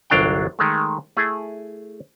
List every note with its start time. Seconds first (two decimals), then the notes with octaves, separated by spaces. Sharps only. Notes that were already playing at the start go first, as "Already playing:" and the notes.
0.10 G1 C2 F#3 D4 F5 G5
0.59 D#3 G#3 A3
1.17 A3 E4 G#4